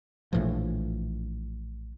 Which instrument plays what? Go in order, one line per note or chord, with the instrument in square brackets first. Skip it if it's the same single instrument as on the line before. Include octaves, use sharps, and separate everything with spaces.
[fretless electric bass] A#1 A2 E3 F3